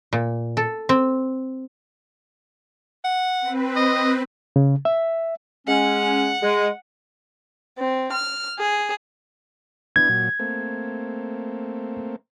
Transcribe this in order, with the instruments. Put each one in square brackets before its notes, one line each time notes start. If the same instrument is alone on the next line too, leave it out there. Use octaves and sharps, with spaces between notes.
[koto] A#2
A4
C4
[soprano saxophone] F#5
[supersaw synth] C4 B4
[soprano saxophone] D#5
[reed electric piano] C#3
E5
[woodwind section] G#3 C#4 [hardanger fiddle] F#5
[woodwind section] G#3
[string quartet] C4
F6
G#4
[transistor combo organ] B3 D4 E4 [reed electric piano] G#6
[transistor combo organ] A#2 F#3
A3 A#3 C4